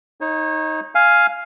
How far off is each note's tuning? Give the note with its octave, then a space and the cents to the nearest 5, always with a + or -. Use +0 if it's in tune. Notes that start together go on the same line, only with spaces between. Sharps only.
D#4 +15 C#5 -35
F5 +0 G#5 +0